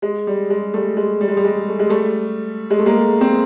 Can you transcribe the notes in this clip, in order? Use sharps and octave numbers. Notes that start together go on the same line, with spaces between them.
G#3
G3
G#3
G3 A3
G#3
G3
G#3
G3
G#3
A3
G#3
G3 A3
G#3
A3
G#3 A#3
C4